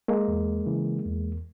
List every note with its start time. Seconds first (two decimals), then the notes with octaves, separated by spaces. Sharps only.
0.08 G#3 A#3
0.28 E2
0.67 C#3 E3
1.05 E2